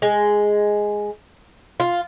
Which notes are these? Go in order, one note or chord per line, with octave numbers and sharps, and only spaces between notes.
G#3
F4